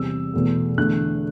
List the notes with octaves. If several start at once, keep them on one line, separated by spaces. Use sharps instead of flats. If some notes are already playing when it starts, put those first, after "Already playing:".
Already playing: E2 C3 G3 E6
E2 B2 A3
E2 D3 A3 F#6